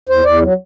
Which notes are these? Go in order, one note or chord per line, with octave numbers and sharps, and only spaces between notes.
E2 C5
E2 D5
F#3